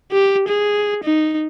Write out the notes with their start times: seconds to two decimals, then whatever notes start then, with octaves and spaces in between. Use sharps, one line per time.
0.12 G4
0.48 G#4
1.04 D#4